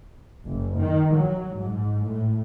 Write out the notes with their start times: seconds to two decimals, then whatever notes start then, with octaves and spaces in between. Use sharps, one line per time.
0.46 F#1
0.78 D#3
1.14 F#3
1.61 G#2
2.06 A2